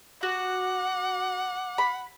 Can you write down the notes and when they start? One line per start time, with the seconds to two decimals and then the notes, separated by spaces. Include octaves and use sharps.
0.23 F#4 F#5 D6
1.78 B5